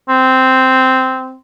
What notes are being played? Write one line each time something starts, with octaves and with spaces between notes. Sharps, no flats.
C4